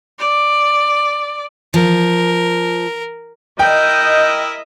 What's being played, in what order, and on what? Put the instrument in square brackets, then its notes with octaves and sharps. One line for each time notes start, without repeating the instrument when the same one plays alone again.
[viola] D5
[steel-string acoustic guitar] F3 [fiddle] A#4
[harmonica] E4 A#4 E5 [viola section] D#5 [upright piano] G5 [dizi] G6